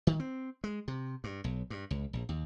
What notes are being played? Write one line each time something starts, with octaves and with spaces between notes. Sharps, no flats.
D#3
C4
G#3
C3
G2
B1
G2
C#2
A#1
D#2